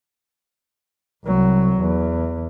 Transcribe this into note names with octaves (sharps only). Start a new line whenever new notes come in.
C2 F#3
E2